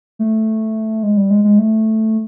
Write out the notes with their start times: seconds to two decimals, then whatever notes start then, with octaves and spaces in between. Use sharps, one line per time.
0.19 A3
1.03 G#3
1.17 G3
1.30 G#3
1.44 G#3
1.59 A3